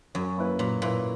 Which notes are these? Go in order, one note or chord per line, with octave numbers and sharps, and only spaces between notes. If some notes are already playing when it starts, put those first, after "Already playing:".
F#2 F#3
A#3 E4 B4
A#2 F#3
A#2 A#3 E4 B4